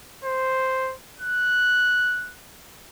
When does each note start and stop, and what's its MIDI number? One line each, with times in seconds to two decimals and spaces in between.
0.24 0.94 72
1.20 2.33 90